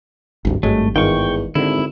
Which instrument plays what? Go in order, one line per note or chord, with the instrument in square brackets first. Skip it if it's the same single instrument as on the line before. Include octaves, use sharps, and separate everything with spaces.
[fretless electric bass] G#1 D2 G2
[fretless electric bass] G#1 G2 [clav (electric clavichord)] F#3 G#3 [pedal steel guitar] A3
[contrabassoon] E2 [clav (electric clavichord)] G#2 D#3 F4 [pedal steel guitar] G5 C#6
[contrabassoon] G#1 [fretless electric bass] D3 [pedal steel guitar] E4